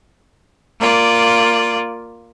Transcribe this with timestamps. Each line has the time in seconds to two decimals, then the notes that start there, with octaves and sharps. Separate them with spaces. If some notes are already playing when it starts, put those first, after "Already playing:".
0.80 A#3 F4 D5